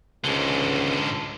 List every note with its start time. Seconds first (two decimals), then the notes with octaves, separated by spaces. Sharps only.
0.24 C#2 G#2 D3